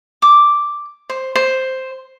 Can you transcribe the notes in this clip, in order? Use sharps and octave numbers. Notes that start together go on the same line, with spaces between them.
D6
C5
C5